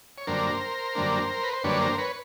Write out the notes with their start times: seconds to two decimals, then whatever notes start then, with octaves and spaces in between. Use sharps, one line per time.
0.18 C#5
0.27 F#2 D3 G3 A#3 D4 A#4 C5
0.95 F#2 D3 G3 A#3 D4
1.43 B4
1.53 C5
1.64 F#2 D3 G3 A#3 D4 B4 C#5
1.81 A#4 C5
1.98 B4 C#5